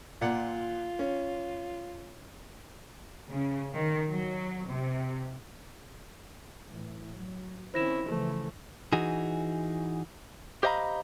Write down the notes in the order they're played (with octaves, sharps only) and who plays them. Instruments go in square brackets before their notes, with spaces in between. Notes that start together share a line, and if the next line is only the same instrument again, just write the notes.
[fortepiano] A#2 D5 F#5 [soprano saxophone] F4
[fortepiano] C#4
[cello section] C#3
D#3
F#3
C3
[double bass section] A2 E3
F#3
[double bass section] D#3 C4 C#4 [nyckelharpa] E4 [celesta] C5 A#6 E7
[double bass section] C#3 E3 F3 [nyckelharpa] A3
[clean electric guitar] E3 D#4 F#4 G#4
G4 C5 D#5 F5 A#5 B5